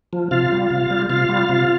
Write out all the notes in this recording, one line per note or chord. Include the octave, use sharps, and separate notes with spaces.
F3
C3 F4 F5
G3
C3
G3
C3 F4 F5
G3
C3